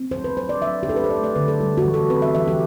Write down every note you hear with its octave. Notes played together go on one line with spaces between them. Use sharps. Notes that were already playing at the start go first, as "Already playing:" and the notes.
Already playing: C4
F#3 C5
B4
F#3 C5
D5
F#3 E5
G4
D4 A4
B4
C5
A3 D5
D5
D3 B4
A4
G3 G4
F#4
E3
A4
C4 B4
E5
E3 E5
G4